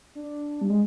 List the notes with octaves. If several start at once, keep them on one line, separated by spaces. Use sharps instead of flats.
D4
G3
G#3